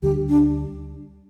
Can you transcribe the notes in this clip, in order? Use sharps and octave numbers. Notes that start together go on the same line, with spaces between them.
D2 D3 G3 G4
D4